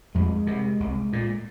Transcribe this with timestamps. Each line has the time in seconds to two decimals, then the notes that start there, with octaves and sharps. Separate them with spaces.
0.15 F2 G#3
0.47 C3
0.80 C2
1.13 A#2